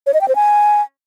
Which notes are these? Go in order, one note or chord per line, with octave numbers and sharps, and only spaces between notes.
C#5
D#5
G5
C5
G#5